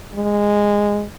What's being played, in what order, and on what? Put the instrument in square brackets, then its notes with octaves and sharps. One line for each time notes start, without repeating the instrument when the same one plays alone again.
[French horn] G#3